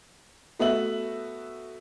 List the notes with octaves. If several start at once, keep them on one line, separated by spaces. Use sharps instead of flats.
A3 B3 F#4 E5 F#7